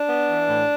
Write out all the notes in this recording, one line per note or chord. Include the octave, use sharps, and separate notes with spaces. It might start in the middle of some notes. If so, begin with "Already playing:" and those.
Already playing: D4
B3
E3
A2